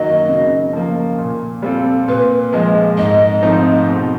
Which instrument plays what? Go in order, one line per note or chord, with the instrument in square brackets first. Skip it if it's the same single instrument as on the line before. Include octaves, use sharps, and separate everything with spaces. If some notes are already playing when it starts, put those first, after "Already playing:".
Already playing: [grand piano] F#2 D#3 F#3 A#3 [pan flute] D#5
[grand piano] C#3
F3 A#3
A#2
G3 C4 F4 A4
[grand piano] A#2 [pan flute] B4
[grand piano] F3 G#3 [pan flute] D#5
[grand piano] G#2 [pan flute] D#5
[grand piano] F3 A3 C4 D#4
B2